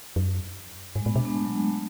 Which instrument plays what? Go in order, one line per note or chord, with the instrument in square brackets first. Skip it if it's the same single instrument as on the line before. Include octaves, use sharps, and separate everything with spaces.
[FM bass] F#2
[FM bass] G#2 [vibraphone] G#3
[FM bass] A2 [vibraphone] B3
[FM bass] B2 [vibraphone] D4
[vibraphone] B3
G#3
A3
F#3
G#3
A3